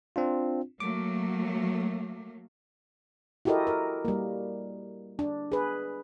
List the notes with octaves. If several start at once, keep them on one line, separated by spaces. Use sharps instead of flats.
C4 D4 F4
F#3 A3 A#3 D6
E4 F#4 G4 A4 A#4 D#5
A#4
G3 A#3
D4
G#4 B4